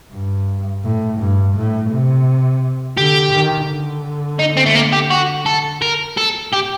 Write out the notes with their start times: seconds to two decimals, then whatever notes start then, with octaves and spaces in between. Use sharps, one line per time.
0.12 G2
0.84 A2
1.19 G2
1.55 A2
1.90 C3
2.97 D3 G4
3.33 D#3
3.68 D3
4.39 D#4
4.57 C4
4.66 A3
4.75 A#3
4.92 G4
5.10 F#4
5.46 A4
5.82 A#4
6.17 A4
6.53 G4